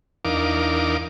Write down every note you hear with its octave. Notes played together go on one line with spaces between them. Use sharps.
E2 D4 D#4 A#4 F5 D6